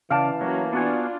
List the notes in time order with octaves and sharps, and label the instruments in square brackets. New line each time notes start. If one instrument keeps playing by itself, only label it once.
[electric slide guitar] C#3 D5 [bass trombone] E3 [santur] F5 A5
[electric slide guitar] F#3 [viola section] A#3 C#4 F#4
[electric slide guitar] B3 F#4 G#5 [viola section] D4 F4